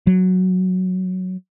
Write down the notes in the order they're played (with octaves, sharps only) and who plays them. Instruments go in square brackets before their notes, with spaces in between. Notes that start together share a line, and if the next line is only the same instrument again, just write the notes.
[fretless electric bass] F#3